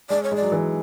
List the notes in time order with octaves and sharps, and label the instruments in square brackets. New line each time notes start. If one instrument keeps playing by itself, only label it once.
[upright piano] G#3 [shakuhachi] D5
[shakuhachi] C#5
[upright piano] G#3 [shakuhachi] D5
[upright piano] F#3
E3